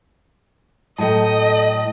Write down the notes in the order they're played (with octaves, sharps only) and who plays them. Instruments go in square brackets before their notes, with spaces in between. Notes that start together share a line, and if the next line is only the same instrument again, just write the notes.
[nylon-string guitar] A2 F#3 [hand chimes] A4 G5 A5 [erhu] D#5